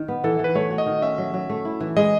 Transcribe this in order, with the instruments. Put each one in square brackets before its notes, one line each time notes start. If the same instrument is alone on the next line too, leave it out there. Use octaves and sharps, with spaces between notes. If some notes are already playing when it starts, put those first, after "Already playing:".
Already playing: [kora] D#3
B3
[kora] E3 [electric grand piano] A4
[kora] E3
[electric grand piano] B4
[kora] A3 [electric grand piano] C#5
[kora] F#4
[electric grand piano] D#5
[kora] D#3
[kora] C#4 [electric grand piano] E5
[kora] F#3
F#3
A3
E4
E3
[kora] G#3 [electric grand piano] D#5